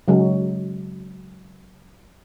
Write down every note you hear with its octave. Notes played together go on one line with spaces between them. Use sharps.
C#3 F#3 G#3